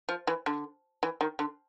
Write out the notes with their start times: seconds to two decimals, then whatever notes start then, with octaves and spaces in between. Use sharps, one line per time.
0.09 F3
0.27 E3
0.46 D3
1.03 E3
1.21 D#3
1.39 D3